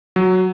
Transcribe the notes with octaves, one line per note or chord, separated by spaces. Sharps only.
F#3